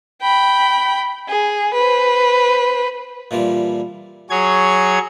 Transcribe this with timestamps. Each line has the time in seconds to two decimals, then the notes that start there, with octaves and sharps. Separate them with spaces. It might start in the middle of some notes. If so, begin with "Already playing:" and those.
0.22 G5 B5
1.28 G#4
1.74 B4 C5
3.31 A#2 E3 F3 G3
4.30 F#3 G#4 C#5 G#6